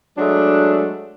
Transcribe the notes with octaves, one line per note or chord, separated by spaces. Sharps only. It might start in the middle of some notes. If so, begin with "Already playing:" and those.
F#3 G#3 A3 D4